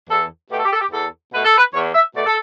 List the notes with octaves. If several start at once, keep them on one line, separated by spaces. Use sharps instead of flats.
E2 A4
B2 A3 G4
A4
G4
A4
G4
E2 A4
B2 A3 B4
A4
B4
E2 C#5
E5
B2 A3 D5
A4